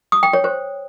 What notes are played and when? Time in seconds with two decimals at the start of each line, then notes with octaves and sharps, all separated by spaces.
0.12 D#6
0.23 G5
0.33 C#5
0.44 C5